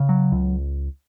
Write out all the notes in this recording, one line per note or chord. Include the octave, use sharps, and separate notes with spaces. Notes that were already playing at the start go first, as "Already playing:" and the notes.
Already playing: C#3
F#3
C#2